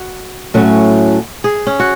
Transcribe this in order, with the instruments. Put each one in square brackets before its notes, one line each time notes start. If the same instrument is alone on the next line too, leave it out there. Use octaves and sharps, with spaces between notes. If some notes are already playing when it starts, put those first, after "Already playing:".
Already playing: [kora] F#4
[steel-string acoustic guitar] A2 F#3 A3 C#4
[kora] G#4
C#4
F#4